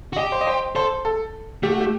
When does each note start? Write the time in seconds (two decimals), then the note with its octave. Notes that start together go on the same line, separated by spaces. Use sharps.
0.13 F#4
0.16 G4 D#5
0.32 C5
0.41 D#5
0.47 C5
0.75 A4 C5
1.05 A4
1.63 A3 G4
1.72 F#4
1.81 G4